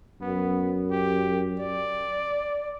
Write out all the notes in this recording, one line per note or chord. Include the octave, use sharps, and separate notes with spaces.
F#2 B3
G4
D5